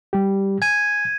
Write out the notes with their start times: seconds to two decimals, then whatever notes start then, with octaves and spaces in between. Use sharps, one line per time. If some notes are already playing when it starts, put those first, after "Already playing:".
0.13 G3 G4
0.62 G#5 G#6 D#7